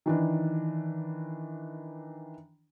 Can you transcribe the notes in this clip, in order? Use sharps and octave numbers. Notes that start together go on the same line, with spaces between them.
D#3 E3 D4